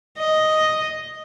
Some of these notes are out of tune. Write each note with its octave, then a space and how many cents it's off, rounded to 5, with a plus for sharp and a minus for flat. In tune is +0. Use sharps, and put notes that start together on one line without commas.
D#5 +0